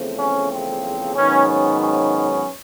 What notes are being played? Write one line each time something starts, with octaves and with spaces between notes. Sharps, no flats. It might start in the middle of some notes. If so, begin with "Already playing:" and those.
Already playing: E2 C#3 F3 A3 C4
C#4
C4
G#2 D#3 F#3 B3 C#4
C#4
C#4